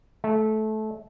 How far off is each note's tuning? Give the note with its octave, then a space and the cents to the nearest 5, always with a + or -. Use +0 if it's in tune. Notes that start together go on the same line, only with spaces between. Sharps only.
A3 -20